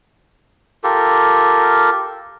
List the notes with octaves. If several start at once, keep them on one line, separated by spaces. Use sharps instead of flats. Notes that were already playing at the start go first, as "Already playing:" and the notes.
F4 G4 A4 A#4